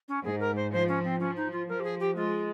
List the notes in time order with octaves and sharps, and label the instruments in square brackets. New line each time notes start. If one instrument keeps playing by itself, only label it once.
[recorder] C#4
[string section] G#2 [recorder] G#4
[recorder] A#4
C5
[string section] F3 [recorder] C5
[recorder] C#4
C4
[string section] F3 [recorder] C#4
[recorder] D#4
F4
[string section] F3 [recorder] A#4
[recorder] G4
G#4
G4
[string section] G#3 [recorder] F4